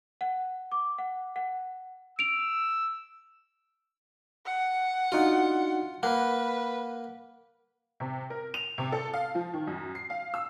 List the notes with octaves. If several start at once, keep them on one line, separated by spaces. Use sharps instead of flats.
F#5
D6
F#5
F#5
E6 D7 F7
F#5
D4 D#4 F4 F#4
A#3 B4 F#5
C3
A#4
F7
C3
A4
F5
F3
D#3
F#2
C7
F5
E6